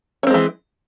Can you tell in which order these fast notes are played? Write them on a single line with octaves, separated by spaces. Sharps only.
C#4 C4 G#3 E3